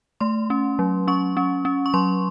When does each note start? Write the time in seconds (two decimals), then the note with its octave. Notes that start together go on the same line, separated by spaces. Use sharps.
0.20 A3 C6
0.50 C#4
0.79 F#3
1.08 C#4 C#6
1.37 C#4
1.65 C#4
1.86 C#6
1.94 F#3 C6